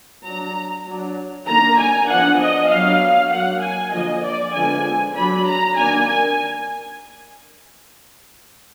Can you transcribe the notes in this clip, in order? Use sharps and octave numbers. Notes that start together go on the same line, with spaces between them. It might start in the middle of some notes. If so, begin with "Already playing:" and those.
F#3 D4 A#5
F#3 D4
D#3 A#3 D4 A#5
G#5
F3 B3 D4 F#5
D#5
F#3 B3 D4 F5
F#3 A#3 D4 F#5
G#5
D3 F3 A#3 D#5
D5
D3 F3 G#3 B3 G#5
F#3 D4 B5
A#5
D#3 A#3 D4 G#5
G#5